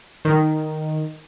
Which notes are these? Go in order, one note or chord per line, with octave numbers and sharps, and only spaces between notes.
D#3